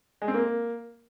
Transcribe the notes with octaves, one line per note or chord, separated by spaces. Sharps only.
G#3
C4
A#3